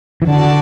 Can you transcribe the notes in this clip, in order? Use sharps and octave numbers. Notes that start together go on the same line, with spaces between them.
E3
D3 F#4 D5 A5